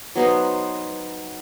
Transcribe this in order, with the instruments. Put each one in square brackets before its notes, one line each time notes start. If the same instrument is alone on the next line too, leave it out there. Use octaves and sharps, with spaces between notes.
[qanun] F#3 B3 D#4 C5